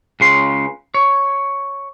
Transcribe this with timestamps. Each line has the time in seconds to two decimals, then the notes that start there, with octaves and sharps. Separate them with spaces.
0.20 C#2 C#3 C6
0.94 C#5